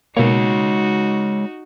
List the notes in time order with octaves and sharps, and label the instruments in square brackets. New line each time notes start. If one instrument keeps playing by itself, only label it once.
[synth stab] B2 A#3 [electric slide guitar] G#3 C#5 [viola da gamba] D#4 F#4